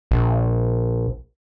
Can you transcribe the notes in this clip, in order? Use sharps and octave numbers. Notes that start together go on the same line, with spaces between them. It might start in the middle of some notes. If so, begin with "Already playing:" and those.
A#1